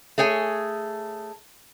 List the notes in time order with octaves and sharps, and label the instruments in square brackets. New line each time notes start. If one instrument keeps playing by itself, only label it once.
[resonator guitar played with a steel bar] A3 G#4 C#5 G#5